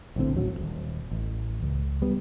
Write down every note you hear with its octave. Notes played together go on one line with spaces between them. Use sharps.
A#1 A2 D3 C4
A1 D#2 F#3
D#1 G#1
A1
C#2
G3 B3